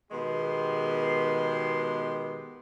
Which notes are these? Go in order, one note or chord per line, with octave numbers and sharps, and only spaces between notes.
B2 D#3 G#3 B3 G4 C6